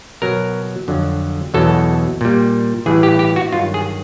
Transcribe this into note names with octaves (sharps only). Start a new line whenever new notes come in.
B2 F#3 A#4
F2 D3 F#3
E2 B2 F#3 A4
A#2 G3
A2 E3 G3 G#4
G4
G4
F#4
G2 D#3 F#3 F4
G#4